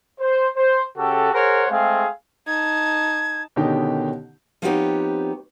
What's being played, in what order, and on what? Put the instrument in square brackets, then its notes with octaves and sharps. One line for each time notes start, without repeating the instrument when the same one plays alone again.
[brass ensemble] C5
C5
C#3 F#4 G4 A4
G#4 A#4 C5 C#5 F#5 A#5
G#3 A3 C4 G#4 F5
[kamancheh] D#4 A5 [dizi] G#6
[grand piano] B2 D3 D#3 C#4 D#4 G4
[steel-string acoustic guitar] F3 B3 C4 D#4 G4 C#5